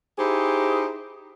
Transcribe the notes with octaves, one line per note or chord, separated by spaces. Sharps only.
D#4 E4 G4 G#4 C5